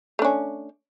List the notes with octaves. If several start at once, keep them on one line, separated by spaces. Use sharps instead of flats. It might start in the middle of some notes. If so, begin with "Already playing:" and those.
A3 C#4 D4